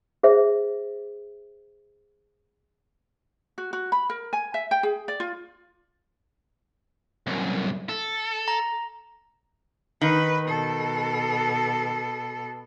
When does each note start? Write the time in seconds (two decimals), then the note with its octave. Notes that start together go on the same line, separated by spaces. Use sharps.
0.23 G#4 C5 E5
3.58 F#4
3.73 F#4
3.92 B5
4.10 A#4
4.33 G#5
4.54 E5
4.71 G5
4.83 G#4
5.08 D5
5.20 F4
7.27 C2 F#2
7.89 A4
8.48 A#5
10.01 D#3 B4
10.48 B2 A4